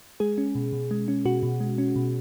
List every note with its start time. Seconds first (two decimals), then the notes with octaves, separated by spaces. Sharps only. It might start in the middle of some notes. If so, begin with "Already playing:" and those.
0.20 G#3 G#4
0.38 C#4
0.55 B2
0.73 B2
0.91 G#3
1.08 C#4
1.25 B2 F#4
1.43 B2
1.60 G#3
1.78 C#4
1.96 B2